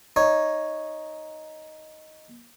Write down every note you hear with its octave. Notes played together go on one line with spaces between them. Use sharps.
D#4 C#5